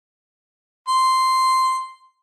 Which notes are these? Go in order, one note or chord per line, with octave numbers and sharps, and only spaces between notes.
C6